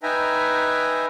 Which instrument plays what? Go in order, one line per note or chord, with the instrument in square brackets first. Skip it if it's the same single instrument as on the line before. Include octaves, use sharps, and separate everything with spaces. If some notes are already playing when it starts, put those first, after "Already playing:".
[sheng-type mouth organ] D#4 B4 E5 G5 G#5 A#5